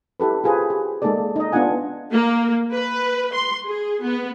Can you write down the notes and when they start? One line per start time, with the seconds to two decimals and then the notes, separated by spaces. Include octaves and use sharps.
0.20 E4 G4 A4 B4
0.44 F4 G4 G#4 B4 C5
0.70 G4
1.02 G#3 A#3 D#4 G#4 A4 D5
1.36 D#4 D#5
1.52 B3 D4 D#4 F4 F#5 G#5
2.13 A#3
2.73 B4
3.33 C6
3.67 G#4
4.03 B3